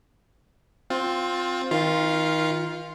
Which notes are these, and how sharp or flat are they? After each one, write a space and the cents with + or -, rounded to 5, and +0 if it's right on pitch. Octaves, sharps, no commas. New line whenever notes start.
C4 +0 F4 +20
D#3 +35 F4 +0 F5 +0